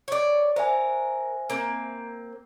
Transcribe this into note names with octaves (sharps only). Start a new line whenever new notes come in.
C#5 D5
A#4 C5 E5 G#5
A#3 C4